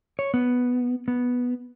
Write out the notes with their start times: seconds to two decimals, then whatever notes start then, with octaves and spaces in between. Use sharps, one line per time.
0.19 C#5
0.34 B3
1.08 B3